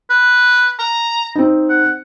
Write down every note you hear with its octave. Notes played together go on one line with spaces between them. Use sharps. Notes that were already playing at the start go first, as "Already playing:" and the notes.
B4
A#5
C4 D#4
F#5